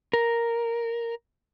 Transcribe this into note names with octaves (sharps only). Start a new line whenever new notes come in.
A#4